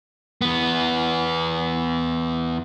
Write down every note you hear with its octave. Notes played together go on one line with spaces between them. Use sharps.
E2 B3